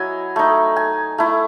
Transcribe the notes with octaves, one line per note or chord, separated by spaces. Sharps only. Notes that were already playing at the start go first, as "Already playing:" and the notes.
Already playing: F#3 E4 D#5 G#5
A3 D#4
G#5
A3 E4